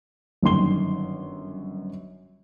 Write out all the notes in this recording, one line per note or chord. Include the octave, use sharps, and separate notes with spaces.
G1 F#2 D#3 C6 G7